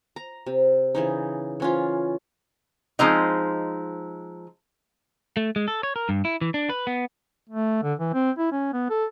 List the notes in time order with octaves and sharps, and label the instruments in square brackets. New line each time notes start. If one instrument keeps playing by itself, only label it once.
[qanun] A#5
C3
C#3 E3 D#4
E3 C#4 F4
[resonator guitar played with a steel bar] F3 G#3 C4 D#4
[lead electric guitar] A3
G#3
A4
C#5
A#4
G2
E4
E3
D4
B4
B3
[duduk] A3
D3
E3
C4
E4
C#4
B3
A4